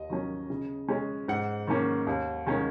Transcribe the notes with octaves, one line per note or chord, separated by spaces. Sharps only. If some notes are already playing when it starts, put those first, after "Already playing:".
Already playing: D#2 D#5
D#3 F#3 C#4
C#3
G#3 C#4
G#2 F#5
D#3 A#3 C#4
D#2
D#3 G#3 C#4